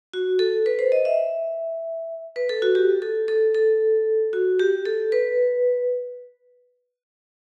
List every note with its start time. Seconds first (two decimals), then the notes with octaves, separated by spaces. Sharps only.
0.14 F#4
0.39 A4
0.66 B4
0.79 C5
0.92 D#5
1.05 E5
2.36 B4
2.49 A4
2.62 F#4
2.75 G4
3.02 A4
3.28 A4
3.55 A4
4.33 F#4
4.59 G4
4.85 A4
5.12 B4